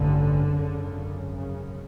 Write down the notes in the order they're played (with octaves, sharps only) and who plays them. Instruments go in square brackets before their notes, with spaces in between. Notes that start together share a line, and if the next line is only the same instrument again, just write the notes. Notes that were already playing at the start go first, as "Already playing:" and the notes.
Already playing: [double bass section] A1 G2 D3
G#1 F#2 C#3
C#3